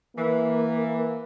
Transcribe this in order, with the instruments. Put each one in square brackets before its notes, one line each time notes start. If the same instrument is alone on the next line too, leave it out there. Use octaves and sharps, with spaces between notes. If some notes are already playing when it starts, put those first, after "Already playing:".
[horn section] E3 [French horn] A#3